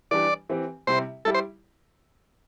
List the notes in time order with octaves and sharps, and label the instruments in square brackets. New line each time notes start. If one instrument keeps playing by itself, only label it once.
[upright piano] E3 G3 D4 G4 [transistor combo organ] D5
[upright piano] E3 C4 G4
[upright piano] C3 G3 E4 G4 [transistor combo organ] C5
[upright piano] G3 E4 G4 [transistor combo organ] A4
[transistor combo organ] C5